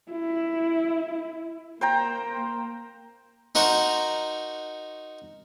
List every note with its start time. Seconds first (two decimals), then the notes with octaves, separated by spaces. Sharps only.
0.12 E4
1.81 A#3 C5 G5 A#5
3.55 D#4 F#4 A#4 C5 C#6